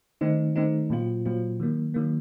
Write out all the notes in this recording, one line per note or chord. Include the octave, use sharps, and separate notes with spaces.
D#3 A3 C4 D#4
D#3 A3 C4 D#4
A#2 F#3 C4 F4
A#2 F#3 C4 F4
D#3 F#3 A#3
D#3 F#3 A#3